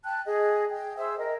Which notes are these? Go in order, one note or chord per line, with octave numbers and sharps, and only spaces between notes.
G5 A5 F#6
G#4 D#5
G5
G#4 C5 E5 E6
A#4 D#5